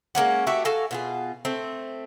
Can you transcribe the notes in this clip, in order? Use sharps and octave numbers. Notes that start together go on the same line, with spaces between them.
G#3 A#3 C#4 F#4
A3 F#4 G4 E5
F#4 A4 F5 G#5
B2 F4 G#4
A3 C4